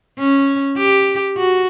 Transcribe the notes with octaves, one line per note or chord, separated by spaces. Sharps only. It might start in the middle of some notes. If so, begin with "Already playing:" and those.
C#4
G4
F#4